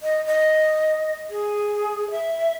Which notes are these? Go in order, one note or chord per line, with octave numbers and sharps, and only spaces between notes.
D#5
D#5
G#4
E5